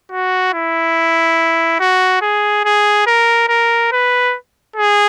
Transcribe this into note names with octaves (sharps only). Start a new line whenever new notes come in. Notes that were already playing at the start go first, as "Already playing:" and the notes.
F#4
E4
F#4
G#4
G#4
A#4
A#4
B4
G#4